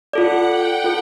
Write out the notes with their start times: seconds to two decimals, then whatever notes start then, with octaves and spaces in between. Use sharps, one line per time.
0.13 F4 A4 D5 F#5
0.49 G5
0.84 F4 A4